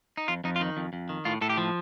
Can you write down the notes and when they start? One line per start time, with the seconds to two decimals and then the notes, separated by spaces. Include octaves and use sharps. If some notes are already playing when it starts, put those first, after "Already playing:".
0.17 D#4
0.28 F2 F4
0.44 F2 D#4
0.56 F4
0.61 D#3 D#4
0.77 F2
0.93 F2
1.09 D#3
1.25 A2 F4
1.41 A2 A4
1.50 G4
1.57 F3